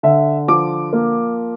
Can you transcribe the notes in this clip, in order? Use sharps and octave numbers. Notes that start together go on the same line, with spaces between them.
D3 E5
F3 D6
A#3